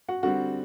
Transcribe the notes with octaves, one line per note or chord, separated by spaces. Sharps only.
F#4 F#5
D3 G3 C4 F#4 F#5